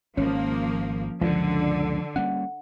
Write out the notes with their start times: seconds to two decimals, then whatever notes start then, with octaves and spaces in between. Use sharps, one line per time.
0.17 G#1 F3 A#3 C#4
1.21 C#2 F#2 A#2 D3 F3
2.16 G3 A#3 C#4 F#5